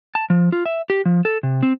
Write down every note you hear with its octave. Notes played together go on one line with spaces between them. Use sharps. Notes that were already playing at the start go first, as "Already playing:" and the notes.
A5
F3
F4
E5
G4
F3
A4
C3
C4